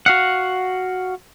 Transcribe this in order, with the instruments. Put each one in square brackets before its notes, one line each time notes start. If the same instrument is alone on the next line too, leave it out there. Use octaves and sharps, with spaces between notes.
[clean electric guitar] F#4 F5 F#5